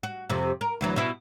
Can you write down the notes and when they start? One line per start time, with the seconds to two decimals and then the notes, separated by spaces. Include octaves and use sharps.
0.03 F#4
0.30 F2 C3
0.61 A#4
0.81 D2 E3 F#3
0.96 B2 E4